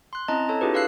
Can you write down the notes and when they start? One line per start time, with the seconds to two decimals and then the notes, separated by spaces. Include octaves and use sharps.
0.13 C6 F#6
0.28 C4 C#4 E4 D#5 A5 A#5
0.49 A4 C#5 A5
0.61 D4 E4 F4 G4 G#4 B4
0.73 G4 B4 F5 E6 F#6 C7